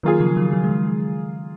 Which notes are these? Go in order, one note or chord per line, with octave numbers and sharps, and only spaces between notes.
D#3 F#3 A#3 F4 G#4
C#3 F3
D#3 F#3
D#3 F#3
G#3
D#3 F#3